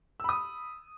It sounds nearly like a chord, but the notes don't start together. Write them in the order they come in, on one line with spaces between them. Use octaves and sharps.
E6 B5 D#6